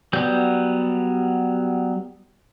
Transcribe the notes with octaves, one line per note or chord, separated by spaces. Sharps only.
F#3 G3 B3 G6